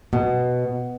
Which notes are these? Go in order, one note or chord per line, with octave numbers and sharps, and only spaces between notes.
B2